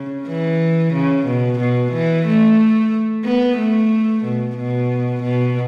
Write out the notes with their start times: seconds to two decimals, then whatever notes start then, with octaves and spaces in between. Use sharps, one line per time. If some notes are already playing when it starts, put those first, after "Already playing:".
Already playing: C#3
0.27 E3
0.93 C#3
1.27 B2
1.60 B2
1.93 E3
2.27 A3
3.25 B3
3.58 A3
4.25 B2
4.57 B2
5.23 B2